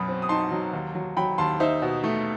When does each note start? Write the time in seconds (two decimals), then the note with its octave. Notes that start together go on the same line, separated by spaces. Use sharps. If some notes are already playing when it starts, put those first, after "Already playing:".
Already playing: F#2 B2 B5 D#6
0.08 C4
0.22 D#6
0.29 D#4 A5 C6
0.51 F#3
0.73 D#2
0.95 F#3
1.17 F#3 G5 B5
1.38 D#2 A5 C6
1.60 D#4 C5 E5
1.82 B2
2.04 A3